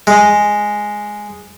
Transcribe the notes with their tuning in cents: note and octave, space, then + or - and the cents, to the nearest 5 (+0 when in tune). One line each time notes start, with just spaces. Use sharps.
G#3 +0